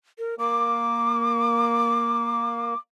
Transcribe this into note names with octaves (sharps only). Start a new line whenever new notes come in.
A#4
A#3 D6